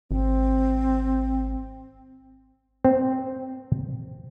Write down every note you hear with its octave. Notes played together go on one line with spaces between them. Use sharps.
G#1 C4
C4